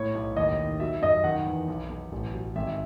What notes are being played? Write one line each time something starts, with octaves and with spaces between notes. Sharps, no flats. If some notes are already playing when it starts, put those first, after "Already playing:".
Already playing: A2 C#5
B1
D#2 D#5
D#3
F#3 E5
F#2 D#5
D#3 F#5
E2
B1
B1
A1
F#3
G#1 E5